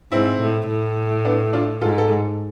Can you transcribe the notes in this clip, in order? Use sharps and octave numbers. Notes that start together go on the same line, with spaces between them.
G#2 C4 E4
A2
A2
B3 D4
D4 F4
G#2 F4 A4
A4